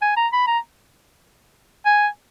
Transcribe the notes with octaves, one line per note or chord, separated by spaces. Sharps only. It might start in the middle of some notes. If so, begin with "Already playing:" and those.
G#5
A#5
B5
A#5
G#5